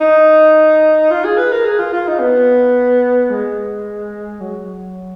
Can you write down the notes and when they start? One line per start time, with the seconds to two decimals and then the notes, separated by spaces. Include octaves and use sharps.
0.01 D#4
1.11 F4
1.24 G#4
1.37 B4
1.52 A#4
1.65 G#4
1.79 F4
1.93 F4
2.07 D#4
2.20 B3
3.30 G#3
4.40 F#3